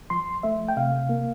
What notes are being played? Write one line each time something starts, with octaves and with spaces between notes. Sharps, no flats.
F3 C6
A3 E5
G5
C3 F5
A#3